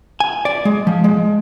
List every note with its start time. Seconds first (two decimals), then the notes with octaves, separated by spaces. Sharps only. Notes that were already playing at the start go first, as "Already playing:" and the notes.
0.20 G#5
0.45 D5
0.65 G#3
0.87 F3
1.04 G#3